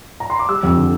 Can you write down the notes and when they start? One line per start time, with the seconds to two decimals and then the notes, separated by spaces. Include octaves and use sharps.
0.20 A#5
0.30 C6
0.39 D6
0.49 G3 E6
0.63 F2
0.77 D3